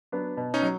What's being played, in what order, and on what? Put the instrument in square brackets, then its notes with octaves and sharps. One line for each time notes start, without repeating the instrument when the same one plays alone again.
[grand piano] F#3 B3 D4
B2
[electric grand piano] C#4 D#4
[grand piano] F#3